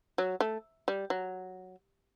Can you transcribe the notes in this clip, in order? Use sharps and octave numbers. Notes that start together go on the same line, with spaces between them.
F#3
A3
G3
F#3